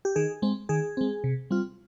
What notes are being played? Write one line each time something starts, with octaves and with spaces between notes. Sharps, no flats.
G4
D#3 G#4
G#3 C4
D#3 G#4
G#3 C4
C3
G3 C4 F4